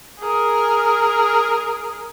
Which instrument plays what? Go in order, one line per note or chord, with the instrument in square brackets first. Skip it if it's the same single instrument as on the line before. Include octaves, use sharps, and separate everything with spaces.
[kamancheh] G#4 A#4